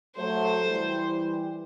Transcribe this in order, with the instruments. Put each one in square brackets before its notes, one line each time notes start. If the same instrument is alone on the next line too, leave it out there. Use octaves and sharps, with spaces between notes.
[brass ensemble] F#3 A3 [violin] C5
[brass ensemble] E3 G3